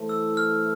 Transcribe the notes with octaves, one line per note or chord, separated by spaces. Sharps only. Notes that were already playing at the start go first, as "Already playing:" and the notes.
Already playing: E3 A3 E4 A4 C5
E6
F6